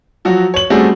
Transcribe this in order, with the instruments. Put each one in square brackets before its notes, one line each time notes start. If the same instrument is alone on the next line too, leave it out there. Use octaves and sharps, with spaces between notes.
[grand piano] F3 F#3 F#4
C#5 F#7
G3 A3 C4 C#4 F#4 G#4